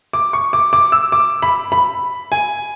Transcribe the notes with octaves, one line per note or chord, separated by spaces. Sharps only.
D6
C#6
D6
D6
E6
D6
B5
B5
G#5